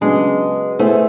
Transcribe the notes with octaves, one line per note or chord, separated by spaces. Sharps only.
C#3 F#3 G#3 B3 D4
A3 B3 E4 G#4 C5